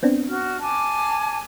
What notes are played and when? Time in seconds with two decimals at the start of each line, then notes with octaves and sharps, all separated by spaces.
0.03 B3 C4 D4
0.29 F#4 F6
0.60 G#5 A5 D6